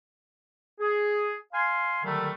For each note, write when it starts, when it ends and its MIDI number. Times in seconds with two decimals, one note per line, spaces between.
0.79 1.32 68
1.53 2.02 77
1.53 2.02 80
1.53 2.02 84
2.04 2.31 50
2.04 2.31 51
2.04 2.31 54
2.04 2.31 55
2.04 2.31 57